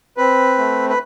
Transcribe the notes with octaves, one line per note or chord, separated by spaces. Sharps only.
C4 B4
A3
B4